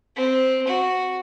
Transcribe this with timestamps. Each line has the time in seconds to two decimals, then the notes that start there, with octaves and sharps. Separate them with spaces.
0.17 C4
0.67 F#4